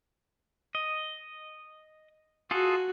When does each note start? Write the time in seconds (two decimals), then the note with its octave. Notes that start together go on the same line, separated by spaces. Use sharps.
0.75 D#5
2.51 F4 F#4 G#4 A4